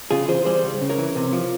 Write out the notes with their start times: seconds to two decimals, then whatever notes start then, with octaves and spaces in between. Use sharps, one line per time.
0.11 C#3 F4 G#4
0.28 E3 G#4 C5
0.45 G3 G#4 C5
0.63 C#2
0.81 C#3
0.89 A#4 C#5
0.98 E3
1.16 C3
1.33 F3